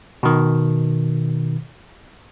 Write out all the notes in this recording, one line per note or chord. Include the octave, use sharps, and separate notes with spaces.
B2 D#3